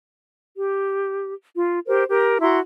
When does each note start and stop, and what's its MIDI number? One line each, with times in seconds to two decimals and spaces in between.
0.57 1.33 67
1.55 1.79 65
1.86 2.03 67
1.86 2.03 70
1.86 2.03 72
2.09 2.39 67
2.09 2.39 70
2.40 2.59 64
2.40 2.59 66
2.40 2.59 82
2.40 2.59 84